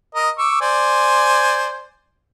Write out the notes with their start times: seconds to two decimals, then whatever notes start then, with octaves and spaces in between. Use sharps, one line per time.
0.15 A#4 D#5
0.38 C#6 D6 E6
0.61 C5 D5 G#5